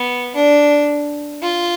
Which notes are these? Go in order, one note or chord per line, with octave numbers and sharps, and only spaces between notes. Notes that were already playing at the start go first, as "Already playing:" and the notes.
Already playing: B3
D4
F4